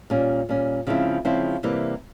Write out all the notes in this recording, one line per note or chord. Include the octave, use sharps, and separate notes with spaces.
A#2 G3 C#4
A#2 G3 C#4
C#3 F3 G#3 C4 E4
C#3 F3 G#3 C4 E4
C3 E3 G3 A#3 E4